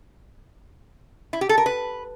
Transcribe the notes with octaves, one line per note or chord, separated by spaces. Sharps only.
E4
G4
A4
A#4
B4